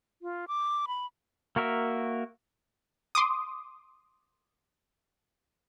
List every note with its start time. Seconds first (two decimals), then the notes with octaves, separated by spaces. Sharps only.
0.22 F4
0.48 D6
0.88 B5
1.56 A#3 F#4 A#4 E5
3.15 C6 D6 D#6